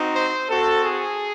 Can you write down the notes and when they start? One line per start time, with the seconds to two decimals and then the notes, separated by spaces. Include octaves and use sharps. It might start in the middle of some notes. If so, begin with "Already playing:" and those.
Already playing: C4 D#4 F#4
0.14 C5
0.49 C4 F#4 A4
0.84 G#4